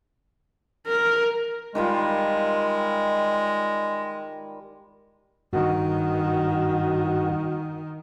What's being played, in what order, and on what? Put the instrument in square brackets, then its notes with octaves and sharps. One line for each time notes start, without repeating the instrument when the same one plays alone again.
[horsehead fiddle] A#4
[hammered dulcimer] D#3 G3 F4 [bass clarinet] G#3
[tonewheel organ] G2 [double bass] D#3 [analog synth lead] F#4